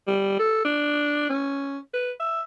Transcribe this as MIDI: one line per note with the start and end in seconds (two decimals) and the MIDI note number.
0.07 0.38 55
0.39 0.60 69
0.65 1.27 62
1.30 1.78 61
1.94 2.12 71
2.20 2.41 76